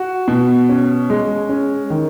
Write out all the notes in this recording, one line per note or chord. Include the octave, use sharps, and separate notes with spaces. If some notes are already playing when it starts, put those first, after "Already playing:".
Already playing: F#4
B2
C#4
G#3
C#4
D#3